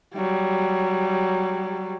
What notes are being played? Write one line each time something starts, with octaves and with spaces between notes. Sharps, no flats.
F#3 G3